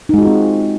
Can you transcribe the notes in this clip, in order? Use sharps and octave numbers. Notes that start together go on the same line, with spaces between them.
G#3 C4 D#4 F4 F#4